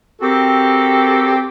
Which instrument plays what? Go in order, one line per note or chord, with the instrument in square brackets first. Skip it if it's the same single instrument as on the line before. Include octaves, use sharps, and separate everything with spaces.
[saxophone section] C4 F#4 G4 A4 A#4